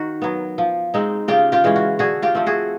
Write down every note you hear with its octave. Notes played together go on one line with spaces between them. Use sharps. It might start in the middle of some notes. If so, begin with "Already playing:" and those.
Already playing: D#3 F#4
F#3 B3
F3
G#3 C4 D#4
C#3 F4 G4
F4 G4
E3 G#3 C#4
F#4
D3 F#4 G#4
F4 G4
F3 A3 C4
F#4 G#4